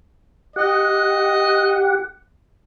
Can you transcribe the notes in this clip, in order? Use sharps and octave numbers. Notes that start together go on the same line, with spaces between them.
G4 D#5 F#5